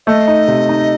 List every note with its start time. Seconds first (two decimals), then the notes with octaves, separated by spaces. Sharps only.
0.07 A3 D#5
0.28 D#4
0.48 C3
0.69 D#4